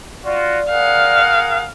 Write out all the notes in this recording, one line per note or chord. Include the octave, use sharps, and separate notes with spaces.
F4 F#4 D5
G#4 A#4 F5 F#5